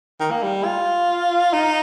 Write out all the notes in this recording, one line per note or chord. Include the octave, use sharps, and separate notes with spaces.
D#3
A#3
G3
F4
D#4